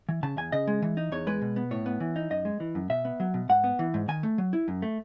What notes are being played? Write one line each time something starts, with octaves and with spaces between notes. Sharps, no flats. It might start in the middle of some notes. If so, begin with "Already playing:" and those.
E3
C#3 A5
E2 G#5
C#3 D#5
G#3
E3
D#4
E2 C#5
G#3 B4
B2
B3
A2 C#5
B3
E3
D#4
F#2 D#5
G#3
E3
F#2
B2 E5
B3
F#3
B2
G#2 F#5
B3
E3
G#2
D#3 G#5
A3
F#3
E4
F#2
A3